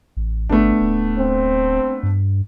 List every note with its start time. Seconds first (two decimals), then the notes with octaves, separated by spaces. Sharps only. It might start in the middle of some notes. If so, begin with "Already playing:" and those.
0.17 A1
0.49 G1 A3 B3 D4
0.81 D1
1.19 C4
2.03 G2